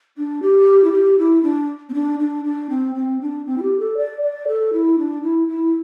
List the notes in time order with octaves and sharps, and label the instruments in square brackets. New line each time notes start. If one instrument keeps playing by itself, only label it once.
[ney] D4
G4
E4
G4
E4
D4
C4
D4
D4
D4
C4
C4
D4
C4
E4
G4
A4
D5
D5
A4
E4
D4
E4
E4